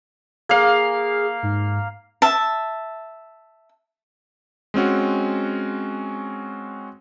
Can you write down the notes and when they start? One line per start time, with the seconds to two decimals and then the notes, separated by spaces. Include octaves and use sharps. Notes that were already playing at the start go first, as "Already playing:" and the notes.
0.49 A#3 G#4 F5
1.43 G#2
2.22 E5 A5
4.74 G#3 C4 C#4 F#4